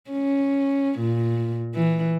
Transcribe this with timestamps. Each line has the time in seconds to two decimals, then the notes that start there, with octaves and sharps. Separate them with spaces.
0.11 C#4
0.99 A#2
1.75 E3